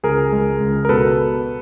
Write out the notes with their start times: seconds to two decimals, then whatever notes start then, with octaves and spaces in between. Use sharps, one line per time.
0.03 C#2 G#4 A#4
0.33 G#3
0.61 C#2
0.85 A#4
0.89 B2 A4 B4